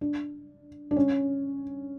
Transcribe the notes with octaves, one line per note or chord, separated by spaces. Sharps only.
D4
D4
C#4